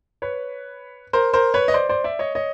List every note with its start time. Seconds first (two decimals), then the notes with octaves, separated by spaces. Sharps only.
0.22 B4 C#5
1.13 A#4 C5
1.33 A#4 C5
1.54 B4 C#5
1.68 D#5
1.74 C5 D5
1.89 C5 D5
2.04 D5 E5
2.19 C#5 D#5
2.35 C#5 D#5